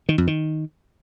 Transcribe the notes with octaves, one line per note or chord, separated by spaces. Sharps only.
D#3
F2
D#3